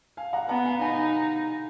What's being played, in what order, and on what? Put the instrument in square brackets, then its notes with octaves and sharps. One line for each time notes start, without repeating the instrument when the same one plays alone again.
[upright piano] F5 G#5
F#5 A#5
[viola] B3 [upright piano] F#5 A#5
[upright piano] F5 G#5
[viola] D#4 [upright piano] G#5 B5